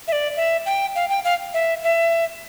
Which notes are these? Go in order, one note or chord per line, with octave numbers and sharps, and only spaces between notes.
E5
D5
E5
G5
F5
G5
F5
E5
E5